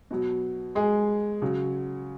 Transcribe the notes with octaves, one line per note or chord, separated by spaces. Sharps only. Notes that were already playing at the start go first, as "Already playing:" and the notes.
B2 F#3
G#3 G#4
C#3 F#3